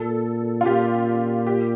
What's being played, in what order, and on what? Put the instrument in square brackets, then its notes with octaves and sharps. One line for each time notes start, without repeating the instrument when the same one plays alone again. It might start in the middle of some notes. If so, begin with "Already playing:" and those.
Already playing: [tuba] A#2 [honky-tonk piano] A4
[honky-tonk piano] F4
[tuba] A#2 [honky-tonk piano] G4
[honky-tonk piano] G4